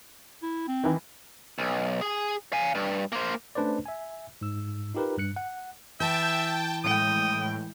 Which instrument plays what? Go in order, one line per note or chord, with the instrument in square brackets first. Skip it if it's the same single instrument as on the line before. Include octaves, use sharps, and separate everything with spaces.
[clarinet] E4
C4
[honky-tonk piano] D#3 E3
[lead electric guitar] B1
G#4
F5 G#5
G2
A#3 C5
[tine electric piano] A3 C#4 D4 B4 C5 D5
E5 G#5
G#2 E6
D#4 F4 G4 A#4 B4
G2 F#6 C#7
F#5
[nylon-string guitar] E3 [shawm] E5 [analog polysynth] G5 A5
[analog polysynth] A2 [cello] G#3 G5 [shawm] D#6